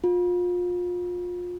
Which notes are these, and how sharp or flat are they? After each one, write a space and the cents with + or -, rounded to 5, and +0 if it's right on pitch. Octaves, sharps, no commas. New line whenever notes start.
F4 +30